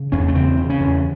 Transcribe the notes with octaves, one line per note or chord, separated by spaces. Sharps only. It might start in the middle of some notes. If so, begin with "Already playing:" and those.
Already playing: C#3
E2 C#4
A3
C#3 C4
C#3
C#4
E2